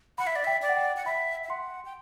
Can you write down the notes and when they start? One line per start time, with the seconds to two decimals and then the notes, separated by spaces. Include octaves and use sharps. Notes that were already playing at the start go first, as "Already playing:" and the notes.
0.18 F#5 B5
0.27 E5
0.36 D5
0.44 E5 G5
0.62 D5
0.69 F#5
0.77 G5
0.96 F#5
1.06 E5 B5
1.44 E5
1.50 F#5 C6
1.85 G5